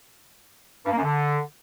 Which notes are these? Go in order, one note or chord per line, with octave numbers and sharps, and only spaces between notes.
G2
A#3
F#2
D3